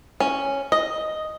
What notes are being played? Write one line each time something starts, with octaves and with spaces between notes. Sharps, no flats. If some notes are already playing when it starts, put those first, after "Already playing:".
C#4
D#5